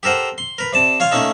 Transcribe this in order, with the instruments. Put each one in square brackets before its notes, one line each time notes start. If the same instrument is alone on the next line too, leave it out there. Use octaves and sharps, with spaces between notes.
[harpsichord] G4 A4 A#4 C5 F#5
C6
A#4 B4
C3 D5 A5
F4 C#5 F5 C#6
A3 A#3 C#4 D#4 A4